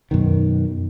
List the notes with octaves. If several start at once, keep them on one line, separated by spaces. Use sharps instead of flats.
F#2 B2 D#3